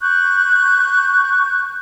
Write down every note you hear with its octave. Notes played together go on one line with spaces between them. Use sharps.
C#6 F#6 G6